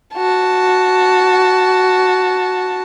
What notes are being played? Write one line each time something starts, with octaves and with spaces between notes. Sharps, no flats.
F#4 A5